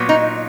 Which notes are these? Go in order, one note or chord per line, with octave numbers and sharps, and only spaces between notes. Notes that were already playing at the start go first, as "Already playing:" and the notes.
Already playing: A#2 F#3 B3
D#4